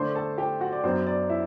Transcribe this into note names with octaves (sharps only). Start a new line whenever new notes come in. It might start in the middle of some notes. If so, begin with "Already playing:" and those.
Already playing: D3 A3 D4 C5 C6
A4 A5
G4 G5
F#4 F#5
D5
F#2 F#3 B3 D4 C5
D5
E4 E5